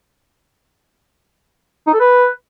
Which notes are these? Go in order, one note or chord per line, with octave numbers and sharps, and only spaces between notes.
D#4
A4
B4